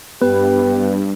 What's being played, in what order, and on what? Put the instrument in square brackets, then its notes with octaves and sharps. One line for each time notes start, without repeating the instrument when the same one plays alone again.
[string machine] G2 [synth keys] B3 [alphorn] G4 [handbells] B4